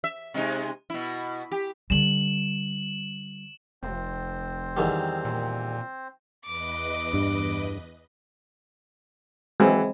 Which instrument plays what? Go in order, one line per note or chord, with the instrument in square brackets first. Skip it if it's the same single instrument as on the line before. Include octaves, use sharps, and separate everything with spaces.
[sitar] E5
C3 G#3 D#4
B2 E4
G4
[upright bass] D3 G3 [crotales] E7 F#7
[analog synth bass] F1 [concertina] C4 C5
[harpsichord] E2 D#3 G3
[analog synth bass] A#2
[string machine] E2 B4 D#5 [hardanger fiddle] D6
[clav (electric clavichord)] G2
[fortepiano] E3 F#3 [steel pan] G#3 C4